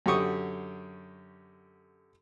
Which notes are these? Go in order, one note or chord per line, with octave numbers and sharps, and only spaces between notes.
F#2 D3 G4 C#6 D#6